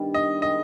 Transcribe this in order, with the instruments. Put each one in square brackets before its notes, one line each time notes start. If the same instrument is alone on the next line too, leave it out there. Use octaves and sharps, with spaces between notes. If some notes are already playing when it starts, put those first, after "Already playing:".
Already playing: [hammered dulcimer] G2 D#3 G3 B3
[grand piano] D#5
[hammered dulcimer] D#3 G#3 [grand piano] D#5